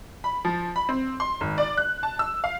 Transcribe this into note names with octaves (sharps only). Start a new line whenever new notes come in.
B5
F3
B5
C4
C6
G#1
D5
F#6
A5
E6
F5